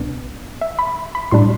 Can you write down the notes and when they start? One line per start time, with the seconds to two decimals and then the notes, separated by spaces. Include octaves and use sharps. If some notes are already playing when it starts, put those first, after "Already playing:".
Already playing: C2 B2 B3 D4
0.61 E5
0.79 B5
1.15 B5
1.31 A2 G3 D4 C6